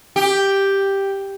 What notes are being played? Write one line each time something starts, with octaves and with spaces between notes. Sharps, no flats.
G4